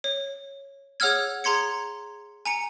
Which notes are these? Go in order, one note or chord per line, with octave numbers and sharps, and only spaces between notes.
C#5
G#4 C#5 F#5 E6 F6 G#6
G#4 A#5 C6 G#6 C#7
G#5 A#5 C#7